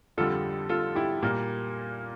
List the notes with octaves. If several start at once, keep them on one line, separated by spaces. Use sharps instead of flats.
F2 D3 G3 F4 A4
F4 A4
E4 G4
A#2 G3 A#3